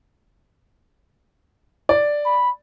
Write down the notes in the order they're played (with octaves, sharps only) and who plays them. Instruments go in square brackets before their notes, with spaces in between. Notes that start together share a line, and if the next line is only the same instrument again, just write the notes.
[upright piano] D5
[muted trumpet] B5